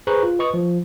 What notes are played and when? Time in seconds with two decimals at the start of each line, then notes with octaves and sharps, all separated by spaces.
0.07 G#4 B4 C5 A#5 C#6 F#6
0.23 F4
0.39 B4 D#5 C#6 D#6
0.54 F3